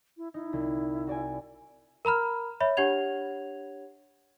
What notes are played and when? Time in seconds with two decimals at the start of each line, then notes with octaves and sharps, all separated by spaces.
0.17 E4
0.34 D#4 E4
0.53 C2
1.07 F#4 D5 G#5
2.05 A#4 A#5 B5 F6
2.60 C#5 E5 B5
2.77 D4 G4 C#5 F#5 G#6 F7